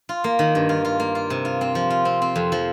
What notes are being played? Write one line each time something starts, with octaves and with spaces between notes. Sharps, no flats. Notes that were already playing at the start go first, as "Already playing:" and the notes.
F4
A#3
D#3
G2
F4
F4
A#3
F4
C3
F4
C4
F3
F4
C4
C4
F2
F3